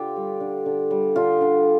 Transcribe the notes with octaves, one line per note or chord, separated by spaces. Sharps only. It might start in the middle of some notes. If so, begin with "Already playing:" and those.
Already playing: D3 F4 G4
G3
D3
D3
G3
D3 F4
D3